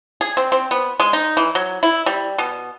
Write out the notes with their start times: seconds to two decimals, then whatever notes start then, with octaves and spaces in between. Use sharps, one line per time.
0.21 G#4
0.37 C4
0.52 C4
0.71 B3
1.00 G#3
1.13 D#4
1.37 E3
1.55 F#3
1.83 E4
2.06 G3
2.38 B2